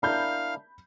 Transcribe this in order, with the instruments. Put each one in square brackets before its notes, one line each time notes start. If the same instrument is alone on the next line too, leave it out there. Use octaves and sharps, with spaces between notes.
[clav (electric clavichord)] D4 E4 A#4 [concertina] F5 [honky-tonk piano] B5 G6